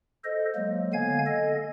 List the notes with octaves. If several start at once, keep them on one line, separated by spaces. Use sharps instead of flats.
A4 C5 D#5
F#3 G#3 A#3
D3 B3 F5 G#5 G#6
A4 D#5